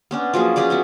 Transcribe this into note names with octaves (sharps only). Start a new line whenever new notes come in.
B3 C#4 D4
F3 F#3 A#3 G#4
C#4 G#4 B4 D5
F#3 B3 E4